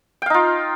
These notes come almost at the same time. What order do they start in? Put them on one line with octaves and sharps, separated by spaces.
G5 F5 D#4 F4